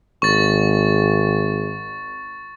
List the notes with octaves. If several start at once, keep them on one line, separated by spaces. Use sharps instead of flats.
G#1 C#6 A6